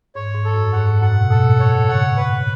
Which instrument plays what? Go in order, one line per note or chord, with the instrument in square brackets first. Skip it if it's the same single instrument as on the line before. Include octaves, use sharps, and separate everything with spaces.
[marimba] G#2 [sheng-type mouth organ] C#5
[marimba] G#2
[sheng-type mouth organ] A4
[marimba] F#2
[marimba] G#2 [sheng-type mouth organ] F#5
[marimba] G#2
[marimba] F#2 [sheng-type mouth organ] F#5
[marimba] B2
A2
[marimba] B2 [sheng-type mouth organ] A4
[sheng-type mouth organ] C#5
[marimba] C#3 [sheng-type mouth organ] F#5
[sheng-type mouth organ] B4